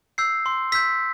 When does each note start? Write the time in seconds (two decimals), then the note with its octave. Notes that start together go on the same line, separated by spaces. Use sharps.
0.18 E6 G6 C7
0.46 C6
0.72 E6 G6 B6